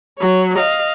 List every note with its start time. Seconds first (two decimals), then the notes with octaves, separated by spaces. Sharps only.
0.18 F#3 C#5
0.56 D#5 F5